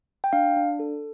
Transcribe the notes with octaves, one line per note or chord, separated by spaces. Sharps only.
G5
D4 F5
D4
A4